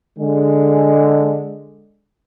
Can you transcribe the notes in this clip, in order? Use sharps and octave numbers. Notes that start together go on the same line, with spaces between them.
D3 G#3